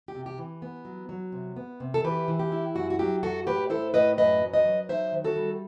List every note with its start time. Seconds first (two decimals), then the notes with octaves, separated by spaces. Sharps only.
0.08 G4
0.15 C3
0.26 G4
0.38 E3
0.62 B3
0.85 F#3
1.09 F#3
1.32 C3
1.57 B3
1.80 C3
1.94 A4
2.04 E3 G4 B4
2.28 E3
2.39 G4
2.52 E4
2.75 F#2 F#4
2.90 F#4
2.99 F#3 G4
3.23 F#2 F#4 A4
3.46 A2 G4 B4
3.70 E4 A4 C5
3.94 A2 B4 D#5
4.17 F#2 B4 D#5
4.42 F#3
4.53 B4 D#5
4.66 F#3
4.89 D#4 C5 E5
5.12 D#3
5.24 F#4 A4
5.36 G3